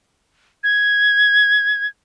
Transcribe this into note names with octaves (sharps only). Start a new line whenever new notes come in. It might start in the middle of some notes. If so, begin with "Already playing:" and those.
G#6